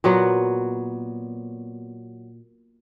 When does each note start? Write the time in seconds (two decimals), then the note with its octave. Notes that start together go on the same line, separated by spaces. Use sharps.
0.04 A#2 F#3 B3 F#4